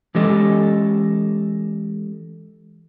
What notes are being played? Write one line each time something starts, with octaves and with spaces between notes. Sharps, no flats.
E3 G#3 C#4 G4 A4 D#5